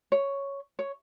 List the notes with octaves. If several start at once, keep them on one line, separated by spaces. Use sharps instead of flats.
C#5
C#5